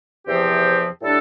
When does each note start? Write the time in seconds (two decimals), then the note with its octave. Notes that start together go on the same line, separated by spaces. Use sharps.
0.28 E2 C3 F3 C4 G4
1.02 A2 G3 D4 A4